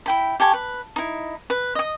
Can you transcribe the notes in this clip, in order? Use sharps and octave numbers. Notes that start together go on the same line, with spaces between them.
E4 G5 B5
G4 A4 G#5 C#6
B4
D#4 E4
B4
D#5 D#6